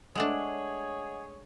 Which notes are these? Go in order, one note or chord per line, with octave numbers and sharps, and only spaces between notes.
G#3 A3 D4 G#4 C#5 D#5 F#5 F#7